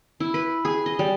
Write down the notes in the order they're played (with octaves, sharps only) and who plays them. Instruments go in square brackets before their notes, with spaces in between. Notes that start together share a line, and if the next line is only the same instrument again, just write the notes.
[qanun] E4
B4
G#4
D#5
G3